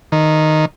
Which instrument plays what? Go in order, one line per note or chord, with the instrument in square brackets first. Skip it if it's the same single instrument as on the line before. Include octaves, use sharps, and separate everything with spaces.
[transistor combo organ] D#3